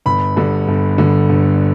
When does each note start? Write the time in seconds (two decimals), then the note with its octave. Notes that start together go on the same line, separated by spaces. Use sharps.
0.06 G1 B5
0.37 G2 D3
0.68 G1
0.98 G2 D3
1.29 G1